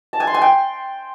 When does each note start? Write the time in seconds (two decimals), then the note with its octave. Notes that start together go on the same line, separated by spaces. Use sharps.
0.13 A5
0.20 G#5
0.27 C6
0.34 G#5
0.42 G5